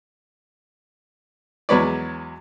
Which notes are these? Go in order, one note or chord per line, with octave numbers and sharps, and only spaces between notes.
E2 F#3 G#3 B4 C#5 D5